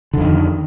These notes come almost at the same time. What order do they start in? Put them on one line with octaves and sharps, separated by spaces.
D3 F2 D#3